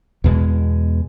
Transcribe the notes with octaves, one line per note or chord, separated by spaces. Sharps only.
E2 B2 G#3